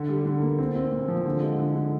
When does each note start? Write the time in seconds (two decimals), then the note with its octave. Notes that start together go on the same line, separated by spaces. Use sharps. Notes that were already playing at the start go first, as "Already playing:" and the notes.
Already playing: D3
0.09 G3
0.25 D3
0.42 A#3
0.59 C4
0.76 C4
0.92 A#2
1.08 F3
1.25 D3
1.42 G#3
1.59 D3
1.75 D3